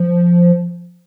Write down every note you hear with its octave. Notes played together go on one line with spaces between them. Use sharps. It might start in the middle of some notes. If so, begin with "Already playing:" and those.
Already playing: F3